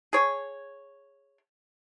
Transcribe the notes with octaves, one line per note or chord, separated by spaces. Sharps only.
G#4 C#5